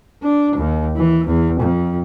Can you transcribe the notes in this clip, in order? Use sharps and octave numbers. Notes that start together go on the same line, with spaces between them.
D4
D#2
E3
E2
F2